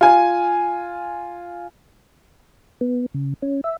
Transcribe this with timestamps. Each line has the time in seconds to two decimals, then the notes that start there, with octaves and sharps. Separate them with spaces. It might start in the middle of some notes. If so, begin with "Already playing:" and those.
0.01 F4 G#5
2.81 B3
3.14 C#3
3.42 C#4
3.64 E5